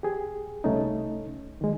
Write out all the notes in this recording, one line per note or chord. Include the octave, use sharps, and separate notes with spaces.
G4 G#4
C2 A3 C#4 D#4
D#3 G#3